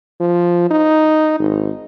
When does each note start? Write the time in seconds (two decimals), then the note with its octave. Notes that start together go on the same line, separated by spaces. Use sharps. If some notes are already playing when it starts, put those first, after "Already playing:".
0.20 F3
0.71 D#4
1.39 G#1